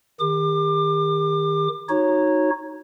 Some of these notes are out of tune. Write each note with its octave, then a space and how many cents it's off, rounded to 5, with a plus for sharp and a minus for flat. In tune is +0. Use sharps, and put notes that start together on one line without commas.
D#3 +0 G4 +40 D6 +30
D#4 +0 F#4 -10 C#5 -10